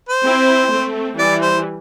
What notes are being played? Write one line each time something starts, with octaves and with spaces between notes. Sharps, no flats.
C5
C4 E4
A3 C4
E3 G3 D5
C5